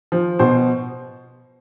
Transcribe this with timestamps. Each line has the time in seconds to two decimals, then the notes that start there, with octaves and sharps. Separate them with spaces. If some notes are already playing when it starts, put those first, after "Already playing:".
0.12 F3
0.39 B2 C5